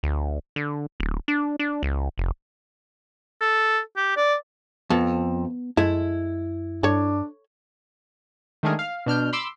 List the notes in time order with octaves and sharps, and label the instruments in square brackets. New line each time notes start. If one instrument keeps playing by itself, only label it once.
[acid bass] D2
D3
D1
D4
D4
C#2
F1
[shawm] A4
G4
D5
[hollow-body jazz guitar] F2 [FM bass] B3 [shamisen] A4
[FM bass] F#2 [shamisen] G#3 A3 [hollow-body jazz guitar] E4
[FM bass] G2 [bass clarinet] D4 [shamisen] A4 C#5
[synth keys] D#3 G#3 A3 D4 G#4 A#4
F5
B2 D4 F6 G6
B5 C6 D6 E6